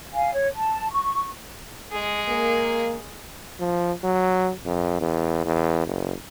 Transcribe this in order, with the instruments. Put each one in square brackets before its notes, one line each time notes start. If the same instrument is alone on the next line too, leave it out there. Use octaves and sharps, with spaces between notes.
[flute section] F5 G#5
C#5
A5
C#6
[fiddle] G#3 G#4
[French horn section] A#3
[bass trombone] F3
F#3
F2
E2
E2
F#1